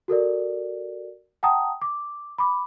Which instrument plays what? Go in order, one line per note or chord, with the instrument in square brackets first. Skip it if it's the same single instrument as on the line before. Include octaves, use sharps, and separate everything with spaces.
[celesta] F#4 A4 A#4 D5
F#5 G5 A5 A#5 D#6
D6
B5 D6